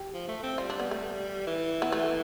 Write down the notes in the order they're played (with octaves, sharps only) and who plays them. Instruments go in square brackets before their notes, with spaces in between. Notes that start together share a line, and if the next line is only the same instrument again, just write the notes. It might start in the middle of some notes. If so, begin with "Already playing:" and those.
Already playing: [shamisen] G4
[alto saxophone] F3
A3
C4
[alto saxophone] G3 [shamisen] F4
[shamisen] D4
B3
A3
[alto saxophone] E3
[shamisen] B3
A3